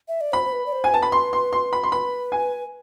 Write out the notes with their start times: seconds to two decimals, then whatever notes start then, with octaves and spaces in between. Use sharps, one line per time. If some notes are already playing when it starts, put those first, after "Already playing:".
0.08 E5
0.21 D5
0.32 C5 B5
0.45 C5
0.52 B4
0.66 D5
0.72 C5
0.84 G#5
0.92 B4 A5
1.02 B5
1.12 C6
1.33 C6
1.53 C6
1.73 B5
1.83 C6
1.92 B4 B5
2.32 G#5